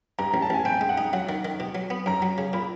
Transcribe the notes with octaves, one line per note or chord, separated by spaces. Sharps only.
G2 A#5
A1 A#5
A5
A1 G#5
C4 G5
G#3
F#5
D#4
F#3 F#5
D#3
D#3
B2
F#3
B3
F#2 A#5
F#3
C#3
A#2 B5